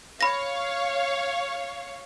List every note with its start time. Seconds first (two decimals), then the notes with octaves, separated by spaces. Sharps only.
0.21 C#5 F5 B5 A#6